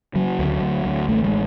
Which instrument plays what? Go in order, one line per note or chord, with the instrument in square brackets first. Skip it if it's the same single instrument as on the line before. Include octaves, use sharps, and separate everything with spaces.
[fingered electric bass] C#3 F#3
D2
D2
D2
A1 A3
G#3